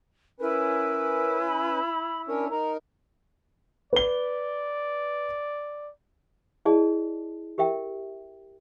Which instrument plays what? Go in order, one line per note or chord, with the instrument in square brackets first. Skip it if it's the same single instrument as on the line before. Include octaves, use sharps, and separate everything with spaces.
[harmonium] C#4 B4 [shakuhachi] E4 [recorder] A#4
[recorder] B5
[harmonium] C#4 D4 C#5 [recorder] A#4
[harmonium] D#4 A#4 [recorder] A#5
[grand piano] B4 G7 [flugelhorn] D5
[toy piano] E4 G#4 D5 D#5 A5
G4 A#4 E5 G5